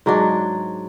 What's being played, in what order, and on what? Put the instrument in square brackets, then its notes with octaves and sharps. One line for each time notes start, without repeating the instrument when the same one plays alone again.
[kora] G#2 F#3 D4